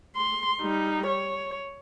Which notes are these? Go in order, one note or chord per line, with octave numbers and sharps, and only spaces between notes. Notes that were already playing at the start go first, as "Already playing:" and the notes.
C6
G3 D#4
C#5